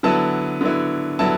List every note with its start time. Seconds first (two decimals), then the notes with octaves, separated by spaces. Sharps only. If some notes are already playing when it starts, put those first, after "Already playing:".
0.03 D3 F#3 B3 E4 A5
0.61 D3 F#3 B3 E4
1.19 D3 F#3 B3 E4 A5